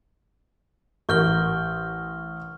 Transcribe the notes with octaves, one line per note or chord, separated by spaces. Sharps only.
A1 A#4 C#6 F6 G6 G7